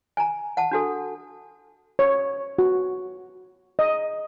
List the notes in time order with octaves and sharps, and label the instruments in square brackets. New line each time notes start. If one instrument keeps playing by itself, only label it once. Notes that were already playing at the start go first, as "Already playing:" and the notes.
[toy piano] G#5 A#5
F#5 A5
D4 F#4 A4
[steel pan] C#5
F#4
D#5